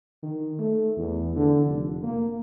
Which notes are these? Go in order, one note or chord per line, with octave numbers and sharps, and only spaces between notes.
D#3
A3
E2
D3
F1
A#3